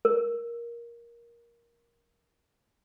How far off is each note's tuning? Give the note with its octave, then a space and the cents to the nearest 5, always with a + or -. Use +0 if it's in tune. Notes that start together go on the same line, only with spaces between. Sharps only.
A#4 +15